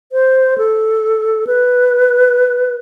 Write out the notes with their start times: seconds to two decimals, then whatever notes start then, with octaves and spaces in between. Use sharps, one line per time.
0.12 C5
0.58 A4
1.47 B4